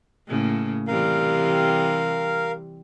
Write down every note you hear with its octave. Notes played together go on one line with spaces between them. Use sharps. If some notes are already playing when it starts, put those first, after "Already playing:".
A2 C#3 A#3
C3 E3 G3 A#4 F5